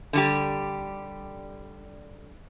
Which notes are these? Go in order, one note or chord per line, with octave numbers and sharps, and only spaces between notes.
D3 G3 G4